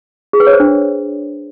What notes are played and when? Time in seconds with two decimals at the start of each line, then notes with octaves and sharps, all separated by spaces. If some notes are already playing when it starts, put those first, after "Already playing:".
0.33 G#4
0.40 B4
0.47 C#5
0.53 C5
0.60 D4